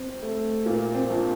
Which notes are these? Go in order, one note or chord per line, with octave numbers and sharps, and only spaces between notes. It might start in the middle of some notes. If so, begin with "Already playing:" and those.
Already playing: C4
A3
A#2 A#3
C4
A#1